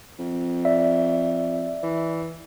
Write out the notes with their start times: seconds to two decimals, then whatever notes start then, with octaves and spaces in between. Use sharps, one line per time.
0.19 F2
0.65 D5 E5
1.83 E3